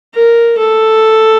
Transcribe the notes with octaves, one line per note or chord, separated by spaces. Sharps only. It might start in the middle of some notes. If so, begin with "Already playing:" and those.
A#4
A4